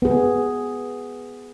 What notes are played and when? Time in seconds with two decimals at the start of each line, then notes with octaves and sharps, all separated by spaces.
0.02 B3 G#4